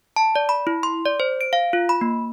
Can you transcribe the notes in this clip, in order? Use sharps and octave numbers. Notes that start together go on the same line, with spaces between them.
A5
D5
B5
E4
C6
D5
C5
D7
F5
F4
B5
A#3